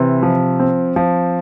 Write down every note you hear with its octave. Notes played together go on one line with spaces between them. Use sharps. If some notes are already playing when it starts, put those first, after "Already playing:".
Already playing: C3 E3
F3
C4
F3